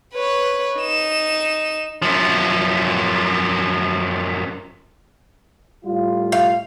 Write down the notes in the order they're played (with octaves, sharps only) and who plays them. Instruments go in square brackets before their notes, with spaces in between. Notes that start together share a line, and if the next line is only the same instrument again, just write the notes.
[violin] B4 C#5
D#4 E7
[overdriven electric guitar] F#2 F3
[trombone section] A2 G3 F4
[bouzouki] F5